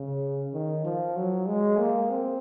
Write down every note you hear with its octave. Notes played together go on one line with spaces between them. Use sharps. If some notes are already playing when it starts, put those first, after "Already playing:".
Already playing: C#3
D#3
F3
F#3
G#3
A#3
C4